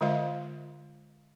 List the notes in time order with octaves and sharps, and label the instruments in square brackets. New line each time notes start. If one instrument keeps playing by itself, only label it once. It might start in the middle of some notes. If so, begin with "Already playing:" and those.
[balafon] D3 G#3 F4 C5 D#5 F5